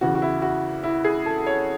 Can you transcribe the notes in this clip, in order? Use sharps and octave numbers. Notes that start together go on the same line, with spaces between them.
E2 C#3 E3 F#4
F#4
E4
F#4
E4
G#4
A4
C#5